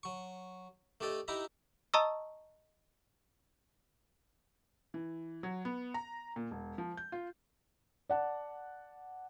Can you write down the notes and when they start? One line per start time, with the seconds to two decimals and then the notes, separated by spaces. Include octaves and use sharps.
0.03 F#3 C#6
1.01 A3 D4 G4 A4 D#5
1.28 D#4 E4 G4 E5 A#5 B5
1.94 D#5 A5 A#5 C#6 D#6 E6
4.94 E3
5.43 F#3
5.65 B3
5.94 A#5
6.36 A#2
6.51 E1
6.78 F3
6.97 G6
7.12 F4
8.09 D5 F#5 A5